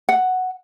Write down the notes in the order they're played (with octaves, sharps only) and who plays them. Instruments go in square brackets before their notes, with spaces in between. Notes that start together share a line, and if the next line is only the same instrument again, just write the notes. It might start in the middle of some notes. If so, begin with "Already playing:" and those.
[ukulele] F#5